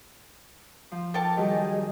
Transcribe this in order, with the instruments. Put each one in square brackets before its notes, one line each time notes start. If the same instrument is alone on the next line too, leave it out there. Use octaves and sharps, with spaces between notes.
[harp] F3
[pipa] A4 G5 A5 [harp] A#4 D6
[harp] D#3 F#3 G3 [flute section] G4 G#4 D#5